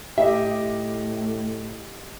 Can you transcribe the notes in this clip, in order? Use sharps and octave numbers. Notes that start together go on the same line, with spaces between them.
A2 G4 D#5 E5